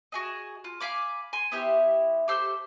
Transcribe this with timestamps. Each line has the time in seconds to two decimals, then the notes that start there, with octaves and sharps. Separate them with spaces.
0.12 F#4 G#4 D#5
0.64 F4
0.81 F5 G#5 B5 D6
1.33 G#5 C6
1.52 B3 E4 G4 C5
2.28 G4 A4 C5 E6